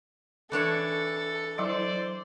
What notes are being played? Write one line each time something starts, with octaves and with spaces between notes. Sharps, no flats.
E3 D4 A4 C#5
F#3 E4 C5 D5